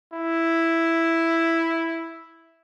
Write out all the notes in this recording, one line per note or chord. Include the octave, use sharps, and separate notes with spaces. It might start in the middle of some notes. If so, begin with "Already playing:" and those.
E4